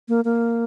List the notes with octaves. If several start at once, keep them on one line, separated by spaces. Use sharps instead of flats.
A#3
A#3